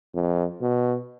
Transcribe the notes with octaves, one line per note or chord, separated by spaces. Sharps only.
F2
B2